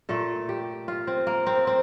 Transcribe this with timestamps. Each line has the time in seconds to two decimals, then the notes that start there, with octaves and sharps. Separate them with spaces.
0.09 A#2 A3 A4
0.49 G4
0.88 F4
1.07 C4
1.27 A#3
1.46 C4
1.67 C4